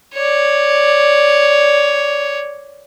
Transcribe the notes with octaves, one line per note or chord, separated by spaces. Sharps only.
C#5 D5